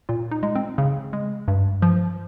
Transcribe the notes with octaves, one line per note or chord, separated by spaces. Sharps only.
A#2 F4
D#4
G#3
C4
C#3
G#3
G2
F3